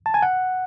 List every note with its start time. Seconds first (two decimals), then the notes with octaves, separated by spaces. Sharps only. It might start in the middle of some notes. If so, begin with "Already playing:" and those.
0.06 A5
0.14 G#5
0.22 F#5